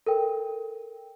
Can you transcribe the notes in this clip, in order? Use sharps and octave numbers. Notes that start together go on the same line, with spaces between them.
A4 A#4 G5